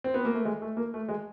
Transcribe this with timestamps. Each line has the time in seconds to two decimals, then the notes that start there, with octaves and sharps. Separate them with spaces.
0.04 C4
0.14 B3
0.25 A#3
0.34 A3
0.45 G#3
0.62 A3
0.77 A#3
0.94 A3
1.09 G#3